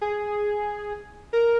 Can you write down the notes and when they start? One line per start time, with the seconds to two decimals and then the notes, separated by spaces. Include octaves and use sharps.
0.01 G#4
1.33 A#4